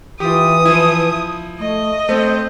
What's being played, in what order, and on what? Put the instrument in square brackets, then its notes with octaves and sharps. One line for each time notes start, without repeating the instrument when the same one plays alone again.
[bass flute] E3 [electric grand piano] F4 G4 [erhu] D#6
[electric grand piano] F3 E4
[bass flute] A3 [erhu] D#5
[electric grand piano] A3 C4 [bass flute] C5